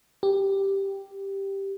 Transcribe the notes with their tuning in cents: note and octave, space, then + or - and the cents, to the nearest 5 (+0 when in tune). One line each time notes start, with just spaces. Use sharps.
G4 +0